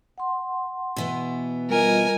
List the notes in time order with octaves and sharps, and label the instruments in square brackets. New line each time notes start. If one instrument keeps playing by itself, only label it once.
[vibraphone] F#5 C6
[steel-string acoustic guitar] B2 E3 B3
[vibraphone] G3 F4 D#5 [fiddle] A#4 G#5